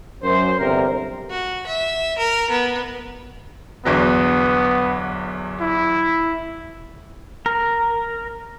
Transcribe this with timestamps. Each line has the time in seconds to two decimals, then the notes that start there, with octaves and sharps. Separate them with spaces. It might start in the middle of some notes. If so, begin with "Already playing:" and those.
0.23 F#2 C5
0.58 G1 C3 A#4
1.30 F#4
1.67 E5
2.18 A#4
2.50 B3
3.85 G1 E2 F#3 B3
5.61 E4
7.46 A#4